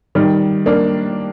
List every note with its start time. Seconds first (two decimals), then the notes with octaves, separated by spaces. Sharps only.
0.15 D#3 G3
0.66 A#3 D4